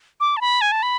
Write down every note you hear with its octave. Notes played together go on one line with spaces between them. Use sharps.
D6
A5
B5
G#5
A5
B5